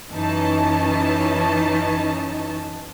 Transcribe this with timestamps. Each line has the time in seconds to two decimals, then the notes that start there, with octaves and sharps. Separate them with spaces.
0.11 F#2 E3 C#4 D#4 D#5 A5